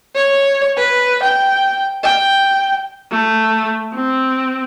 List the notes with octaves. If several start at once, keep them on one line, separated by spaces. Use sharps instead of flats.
C#5
B4
G5
G5
A3
C4